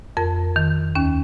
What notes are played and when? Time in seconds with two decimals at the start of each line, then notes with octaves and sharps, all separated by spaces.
0.17 F2 A#4
0.56 D#3
0.95 D#2 C#4